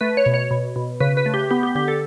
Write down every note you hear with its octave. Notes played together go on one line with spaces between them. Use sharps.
A3 B4
C#5
B2
C#5
B2
B2
C#3 B4
B4
A3
G4
B3 G4
G4
D3 G4
A4